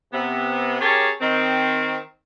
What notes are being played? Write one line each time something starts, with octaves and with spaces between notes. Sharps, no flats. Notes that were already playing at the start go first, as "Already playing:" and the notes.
C3 B3
C#4 G4 G#4 A#4 C#5 A5
D#3 C4